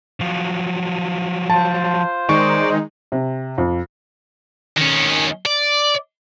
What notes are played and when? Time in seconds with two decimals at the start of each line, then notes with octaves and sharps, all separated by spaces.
0.21 F3 F#3
1.50 F4 C5 A5
2.29 D#3 G#3 D#4 C5 D5 C#6
3.12 C3
3.58 F2
4.77 D#3 C#4
5.46 D5